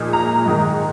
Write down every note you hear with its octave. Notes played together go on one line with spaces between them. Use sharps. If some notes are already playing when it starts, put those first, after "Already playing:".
Already playing: A#2 F3 G#3 D#4
A#5
G#2 D#3 G#3